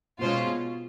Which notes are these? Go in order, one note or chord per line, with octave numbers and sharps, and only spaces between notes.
B2 G#3 C#4 F4 C5